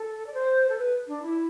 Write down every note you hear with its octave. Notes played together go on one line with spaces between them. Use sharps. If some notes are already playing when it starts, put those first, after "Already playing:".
Already playing: A4
D5
C5
A4
B4
D4
E4